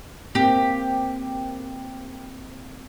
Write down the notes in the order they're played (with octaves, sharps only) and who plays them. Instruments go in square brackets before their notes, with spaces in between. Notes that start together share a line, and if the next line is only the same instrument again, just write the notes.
[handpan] A#3 C4 [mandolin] G4